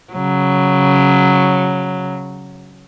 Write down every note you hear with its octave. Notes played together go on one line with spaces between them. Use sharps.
C#3 F#3